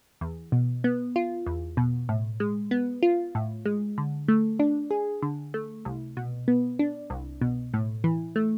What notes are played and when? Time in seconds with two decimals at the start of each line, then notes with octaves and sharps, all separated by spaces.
0.21 E2
0.52 B2
0.84 B3
1.16 F4
1.46 E2
1.77 B2
2.09 A2
2.40 G#3
2.71 B3
3.03 F4
3.35 A2
3.66 G#3
3.98 D3
4.28 A3
4.59 D4
4.91 G#4
5.22 D3
5.54 A3
5.85 C2
6.17 B2
6.48 B3
6.79 D4
7.10 C2
7.41 B2
7.74 A2
8.04 E3
8.36 A3